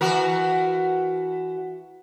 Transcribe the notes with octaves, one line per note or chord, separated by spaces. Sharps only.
E3 F#4 A#4